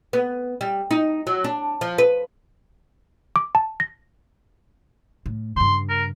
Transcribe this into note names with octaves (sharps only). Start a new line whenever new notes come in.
B3
G3
D#4
F#3
D4
F3
B4
D6
A5
A#6
A2
G2 C#3 C6
A#4